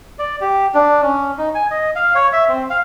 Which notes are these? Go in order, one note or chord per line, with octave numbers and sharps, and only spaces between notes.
D5
G4
D4
C#4
D#4
G#5
D#5
F5
C#5
E5
C4
F5